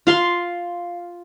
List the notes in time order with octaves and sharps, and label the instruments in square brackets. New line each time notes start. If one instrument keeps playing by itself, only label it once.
[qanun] F4 F5 C6